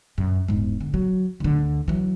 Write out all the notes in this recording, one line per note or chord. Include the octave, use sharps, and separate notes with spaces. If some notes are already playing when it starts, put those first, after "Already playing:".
F#2
E1 G#2
D3
F#3
D2 D3
E3 F#3